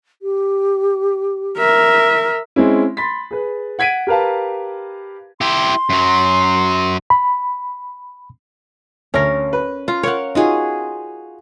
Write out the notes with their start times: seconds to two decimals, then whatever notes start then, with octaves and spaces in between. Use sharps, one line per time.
0.22 G4
1.58 A#4 E5
2.56 G#3 C4 C#4 E4
2.97 B5 C6 A6 B6
3.31 G#4 B4
3.79 F#5 G#6 B6 D7 D#7
4.07 G4 A#4 B4 F5 A5
5.41 E4 G4 C6
5.90 F#2 F#3
7.10 B5
9.14 D2 C#4 A#4
9.53 B4
9.88 F4 A#5
10.03 A#4 C#5 F5 F#5
10.35 D#4 F4 F#4 G#4